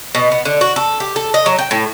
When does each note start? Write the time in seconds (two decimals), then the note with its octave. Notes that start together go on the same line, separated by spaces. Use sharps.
0.15 B2
0.32 B3
0.45 D3
0.61 F#4
0.76 A4
1.00 G4
1.16 A4
1.34 D#5
1.46 F#3
1.59 G5
1.71 A2